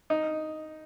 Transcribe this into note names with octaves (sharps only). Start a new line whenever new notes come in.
D#4